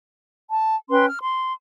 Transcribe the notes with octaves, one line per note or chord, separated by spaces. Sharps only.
A5
C#4 B4 G5 C6
F6
C6